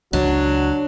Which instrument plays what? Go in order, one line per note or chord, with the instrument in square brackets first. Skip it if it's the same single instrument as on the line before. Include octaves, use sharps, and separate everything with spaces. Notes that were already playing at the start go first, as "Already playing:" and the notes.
[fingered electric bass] C#2 [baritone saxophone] F#3 [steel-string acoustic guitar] D4 [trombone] F#4